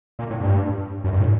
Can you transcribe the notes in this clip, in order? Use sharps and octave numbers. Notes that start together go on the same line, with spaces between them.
A#2
A2
G2
F#2
G2
A2